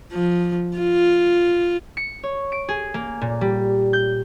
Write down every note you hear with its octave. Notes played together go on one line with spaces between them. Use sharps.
F3
F4
C#7
C#5
D7
G#4
A#3
A#2
G3
G6